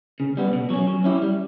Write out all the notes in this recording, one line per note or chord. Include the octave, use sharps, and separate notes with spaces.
C#3
G3 B3
B2
F#3 C#4
F#3
C#4 E4 G4
G3